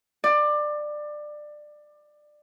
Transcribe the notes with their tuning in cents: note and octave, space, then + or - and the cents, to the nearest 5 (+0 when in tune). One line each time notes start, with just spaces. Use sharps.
D5 +20